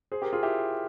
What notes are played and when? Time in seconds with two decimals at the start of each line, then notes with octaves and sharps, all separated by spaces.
0.12 G#4 C5
0.22 G4 A#4
0.33 F4 G#4
0.43 E4 G4